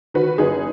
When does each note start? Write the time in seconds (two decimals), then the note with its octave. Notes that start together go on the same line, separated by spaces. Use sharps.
0.14 D#3 F#4 B4
0.38 F#1 D#4 G#4